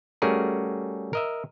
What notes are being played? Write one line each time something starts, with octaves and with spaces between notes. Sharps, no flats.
G3 A3 C#4 F#4 G#4 A#4
A#4 D#5 E5